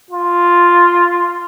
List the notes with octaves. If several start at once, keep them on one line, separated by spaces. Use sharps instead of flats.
F4